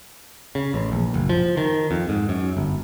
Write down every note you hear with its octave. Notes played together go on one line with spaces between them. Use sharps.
C#3
A1
A#1
F#1
F3
D#3
F2
G#2
F#2
G1